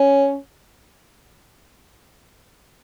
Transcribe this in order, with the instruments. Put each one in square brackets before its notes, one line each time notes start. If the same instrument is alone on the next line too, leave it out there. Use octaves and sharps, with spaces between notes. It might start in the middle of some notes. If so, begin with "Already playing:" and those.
Already playing: [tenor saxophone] C#4